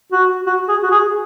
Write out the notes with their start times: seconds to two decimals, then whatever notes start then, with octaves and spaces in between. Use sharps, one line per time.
0.13 F#4
0.47 F#4
0.69 G#4
0.83 F#4
0.91 G#4